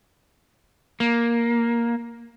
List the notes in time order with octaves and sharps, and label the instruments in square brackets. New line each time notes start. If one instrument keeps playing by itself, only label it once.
[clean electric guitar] A#3